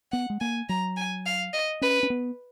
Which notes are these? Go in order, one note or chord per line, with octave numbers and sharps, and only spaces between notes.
B3 F#5
G#3
A#3 G#5
F#3 A#5
G#5
F5
D#5
C#4 B4
C#4
B3